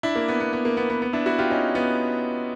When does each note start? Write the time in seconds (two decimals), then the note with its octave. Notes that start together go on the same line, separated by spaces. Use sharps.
0.03 D4 E4
0.15 A#3
0.28 B3
0.40 B3
0.53 B3
0.65 A#3
0.77 B3
0.90 B3
1.02 B3
1.13 D4 E4
1.26 E4 F#4
1.39 F4 G4
1.50 C#4 D#4
1.75 B3